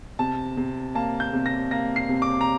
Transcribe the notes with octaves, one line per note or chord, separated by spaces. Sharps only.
C3 A5
C3
A#3 A5
G6
C3
A#6
A#3 A#6
C7
C3
D6
A#5